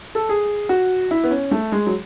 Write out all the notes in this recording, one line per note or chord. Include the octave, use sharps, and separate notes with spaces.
A4
G#4
F#4
E4
B3
C#4
A3
G#3
F#3